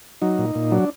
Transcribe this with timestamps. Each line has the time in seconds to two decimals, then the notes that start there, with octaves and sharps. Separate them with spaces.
0.22 F#3 D#4
0.39 A#2
0.55 A#2
0.71 F#3 D4